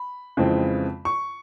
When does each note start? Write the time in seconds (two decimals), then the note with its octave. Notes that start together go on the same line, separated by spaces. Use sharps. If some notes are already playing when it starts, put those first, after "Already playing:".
Already playing: B5
0.37 F2 C#3 E3 G#3 C4
1.05 C#6